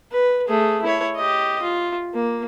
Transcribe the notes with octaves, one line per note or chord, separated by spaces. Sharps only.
B4
A3 G#4
E4 C#5
G4 D#5
F4
A#3